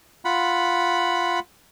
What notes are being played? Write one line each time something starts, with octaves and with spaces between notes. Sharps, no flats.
F4 F#5 B5